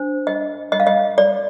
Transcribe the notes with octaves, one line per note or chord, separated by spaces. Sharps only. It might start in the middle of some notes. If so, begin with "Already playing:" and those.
Already playing: D4 C5
D#5
D#5
F5
D#5
D5